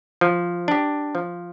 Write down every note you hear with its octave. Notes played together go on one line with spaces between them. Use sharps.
F3
D4 G4
F3